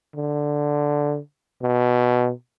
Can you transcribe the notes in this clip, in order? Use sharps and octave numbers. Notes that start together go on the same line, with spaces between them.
D3
B2